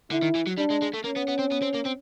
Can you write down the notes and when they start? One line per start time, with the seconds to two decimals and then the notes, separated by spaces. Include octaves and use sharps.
0.11 D3 E4
0.22 D#3
0.35 E3
0.47 F#3
0.57 G3 D4
0.70 G#3
0.82 G#3
0.93 A3
1.04 A#3 C#4
1.16 B3
1.28 B3
1.39 C4
1.52 B3
1.62 C4
1.75 A#3
1.86 C4